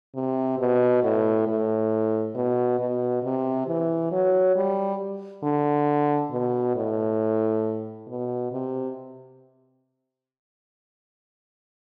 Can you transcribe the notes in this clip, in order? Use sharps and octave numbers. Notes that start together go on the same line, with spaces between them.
C3
B2
A2
A2
B2
B2
C3
E3
F#3
G3
D3
B2
A2
B2
C3